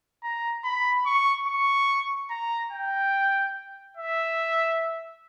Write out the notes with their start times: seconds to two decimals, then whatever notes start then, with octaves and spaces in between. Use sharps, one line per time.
0.23 A#5
0.64 B5
1.06 C#6
1.47 C#6
2.30 A#5
2.72 G5
3.97 E5